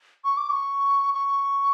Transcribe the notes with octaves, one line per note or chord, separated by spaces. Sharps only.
C#6
D6
C#6
C#6